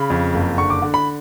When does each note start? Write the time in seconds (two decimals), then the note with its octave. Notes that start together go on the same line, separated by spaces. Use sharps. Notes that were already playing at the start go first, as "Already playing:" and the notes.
Already playing: C#3 B5
0.10 F2
0.34 F#1
0.58 D3 C#6
0.70 D6
0.82 D3
0.94 B5